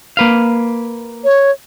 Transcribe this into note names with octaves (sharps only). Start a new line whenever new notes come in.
A#3 B4 F5
C#5